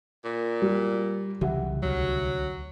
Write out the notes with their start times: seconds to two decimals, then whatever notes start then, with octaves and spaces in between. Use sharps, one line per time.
0.25 A#2
0.62 G3 G4
1.41 C2 C#3 E3 F#3 G4 E5 F#5
1.83 D2 F#3